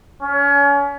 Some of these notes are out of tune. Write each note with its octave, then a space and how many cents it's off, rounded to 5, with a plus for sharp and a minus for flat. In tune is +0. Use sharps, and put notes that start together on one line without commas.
C#4 +35